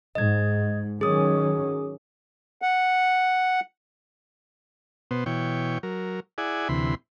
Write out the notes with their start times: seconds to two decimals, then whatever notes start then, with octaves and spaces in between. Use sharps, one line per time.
0.15 G#2 D#5 G#6
1.01 D#3 F#3 C#4 G#4 D#6
2.62 F#5
5.11 B2 B3 C5
5.26 B2 E3 C#5 G5
5.83 F#3 A#4
6.38 E4 G#4 D5 F#5 G#5
6.69 D2 C3 E3 B5 C6